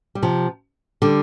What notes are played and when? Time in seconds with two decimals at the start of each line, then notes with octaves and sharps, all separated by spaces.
0.15 G3
0.23 C3 F3
1.02 D3 G3